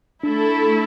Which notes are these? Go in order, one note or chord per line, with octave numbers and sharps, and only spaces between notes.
A3 D4 E4 A4